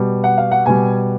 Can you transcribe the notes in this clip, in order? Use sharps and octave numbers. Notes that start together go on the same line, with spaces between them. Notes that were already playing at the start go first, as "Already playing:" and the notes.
Already playing: B2 G3
F#5
F5
F#5
B2 G3 G#5